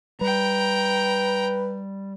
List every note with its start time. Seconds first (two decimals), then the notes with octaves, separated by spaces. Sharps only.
0.21 G3 B4 G5 A#5